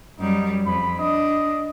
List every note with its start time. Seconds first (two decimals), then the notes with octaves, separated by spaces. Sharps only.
0.20 F#2 G3 D#4
0.66 F2 B5
0.99 D4 D#5